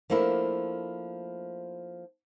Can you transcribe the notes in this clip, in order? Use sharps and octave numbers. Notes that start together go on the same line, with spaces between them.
F3 A3 A#3 D4 E4